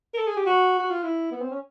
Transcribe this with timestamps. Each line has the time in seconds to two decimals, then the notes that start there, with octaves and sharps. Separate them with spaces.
0.14 A#4
0.18 A4
0.27 G#4
0.37 G4
0.46 F#4
0.79 F#4
0.91 F4
1.03 E4
1.32 B3
1.41 C4
1.50 C#4